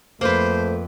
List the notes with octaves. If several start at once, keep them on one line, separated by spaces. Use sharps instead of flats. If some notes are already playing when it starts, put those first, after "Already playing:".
F2 A3 A#3 B4 C5